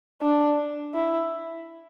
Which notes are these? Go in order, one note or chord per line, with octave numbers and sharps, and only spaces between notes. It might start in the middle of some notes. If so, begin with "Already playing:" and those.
D4
E4